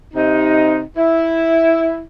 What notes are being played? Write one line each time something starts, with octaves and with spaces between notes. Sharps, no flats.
C3 D#4
E4